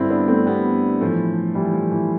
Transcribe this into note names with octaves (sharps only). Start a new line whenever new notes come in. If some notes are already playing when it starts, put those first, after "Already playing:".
Already playing: G2 D3 C4 E4
B3 D4
A3 C4
G3 B3
A2 E3 F3 A3
E3 G3
F3
E3